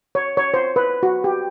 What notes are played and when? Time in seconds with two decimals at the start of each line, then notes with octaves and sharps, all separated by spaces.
0.15 C#5
0.37 C#5
0.54 C5
0.76 B4
1.03 F#4
1.24 G4